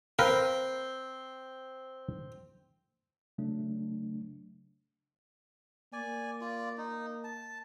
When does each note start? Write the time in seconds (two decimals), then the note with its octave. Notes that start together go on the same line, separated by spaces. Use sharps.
0.19 C4 A#4 B4 F5
3.38 C#3 F#3 A3 D4
5.93 A#3 D5 G#5
6.41 F4 D5
6.78 D#4
7.24 A5